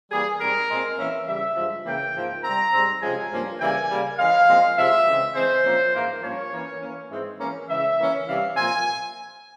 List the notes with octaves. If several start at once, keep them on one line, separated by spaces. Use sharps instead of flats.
E3 G3 A#3 G#4
G#2 G3 C4 A#4
A#2 G#3 C4
E3 A#3 C#4 E5
C#3 E3 G3 E5
G2 F3 G#3
C#3 E3 A#3 C#4 G5
G#2 F3 A#3
C3 G3 C4 A#5
G#2 G3 C4
C3 F3 G#3 C#4 G#5
G2 F3 A#3 C#4
C#3 E3 G3 A#3 G#5
C#3 G3 A#3
E3 G#3 C#4 F5
A#2 F3 G#3 C4
C3 F3 G#3 E5
C#3 E3 G#3 C4
E3 G#3 C4 C5
A#2 F3 A#3 C#4
G#2 E3 A#3
G2 F3 A#3 C#4 C#5
E3 A#3 C#4
E3 A#3 C#4
G#2 E3 G#3 C4
E3 A#3 C#4
C#3 E3 G#3 E5
E3 A#3 C#4
C3 E3 G3 C#4 F5
A#2 F3 C4 G#5